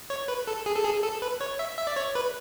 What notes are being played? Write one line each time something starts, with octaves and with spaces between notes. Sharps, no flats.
C#5
B4
A4
G#4
A4
G#4
A4
B4
C#5
E5
E5
D5
C#5
B4